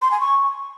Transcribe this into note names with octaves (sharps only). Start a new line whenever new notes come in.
C6
G#5
C#6